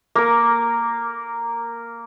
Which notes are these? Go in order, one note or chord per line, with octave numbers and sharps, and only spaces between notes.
A#3 A#4